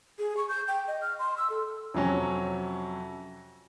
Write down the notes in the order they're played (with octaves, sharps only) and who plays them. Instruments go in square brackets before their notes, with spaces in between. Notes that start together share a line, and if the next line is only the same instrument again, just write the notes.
[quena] G#4
C#6
G6
G5
D#5
F6
C6
E6
A4
[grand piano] F2 C3 F#3 C#4